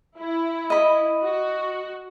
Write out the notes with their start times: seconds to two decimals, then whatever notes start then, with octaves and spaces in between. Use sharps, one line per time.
0.17 E4
0.70 D#5 B5
1.21 F#4